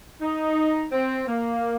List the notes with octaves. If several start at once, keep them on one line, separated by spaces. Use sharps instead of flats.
D#4
C4
A#3